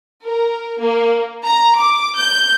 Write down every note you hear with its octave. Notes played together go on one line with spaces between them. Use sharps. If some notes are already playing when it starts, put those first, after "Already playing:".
A#4
A#3
A#5
D6
G6